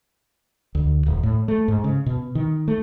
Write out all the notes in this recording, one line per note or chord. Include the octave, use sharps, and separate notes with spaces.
D2
D#1
A2
A3
G#2
C#3
B2
D#3
A3